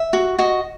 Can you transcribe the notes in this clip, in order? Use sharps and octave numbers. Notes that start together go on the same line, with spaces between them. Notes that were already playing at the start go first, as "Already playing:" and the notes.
Already playing: E5
F#4
F#4 D#5